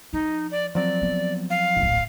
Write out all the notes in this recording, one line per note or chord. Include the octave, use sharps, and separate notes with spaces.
F3 D#4
D5
F3 F#3 C4 D5
B3
F5
D1 A#1